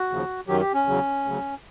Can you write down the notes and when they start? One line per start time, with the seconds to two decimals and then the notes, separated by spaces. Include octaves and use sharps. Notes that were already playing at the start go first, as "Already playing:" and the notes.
Already playing: F#4
0.10 D#2 C#3 F3
0.48 F#2 D#3 F#3 G4
0.61 G4
0.74 C#4
0.86 E2 C#3 F#3
1.25 D2 C#3 F#3